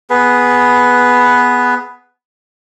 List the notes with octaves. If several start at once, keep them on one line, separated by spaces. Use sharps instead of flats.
B3 G#4 B4